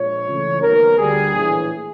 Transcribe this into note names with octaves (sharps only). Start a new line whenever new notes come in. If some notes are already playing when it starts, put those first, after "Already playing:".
Already playing: A#1 A#2 F3 G#3 C#5
C#2 C#3 E3 A3 C#4
D#2 D#3 F#3 B3 A#4
D2 D3 G3 G#4
A#1 A2 E3